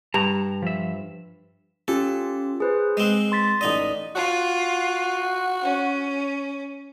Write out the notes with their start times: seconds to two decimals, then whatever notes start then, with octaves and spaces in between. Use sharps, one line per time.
0.14 G2 A5 A#5
0.62 F3 E5
1.88 C#4 F4 G4 A4
2.60 G#4 B4 C5
2.97 G#3 C4
3.32 C6 A6 B6
3.61 A1 D#4 D5 D#5 D#6
4.15 F4 F#4
5.62 C#4